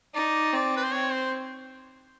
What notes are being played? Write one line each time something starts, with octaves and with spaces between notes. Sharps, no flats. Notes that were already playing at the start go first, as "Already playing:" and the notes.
D#4 D5
C4 D5
B4
C5
C4 C#5
C5